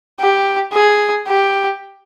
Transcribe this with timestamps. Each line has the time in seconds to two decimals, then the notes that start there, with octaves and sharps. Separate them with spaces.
0.20 G4
0.73 G#4
1.28 G4